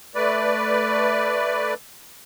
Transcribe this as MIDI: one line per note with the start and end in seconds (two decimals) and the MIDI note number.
0.15 1.74 57
0.15 1.74 71
0.15 1.74 74